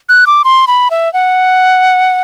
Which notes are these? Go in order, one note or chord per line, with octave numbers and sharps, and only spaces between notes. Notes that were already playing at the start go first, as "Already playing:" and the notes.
F#6
D6
C6
B5
E5
F#5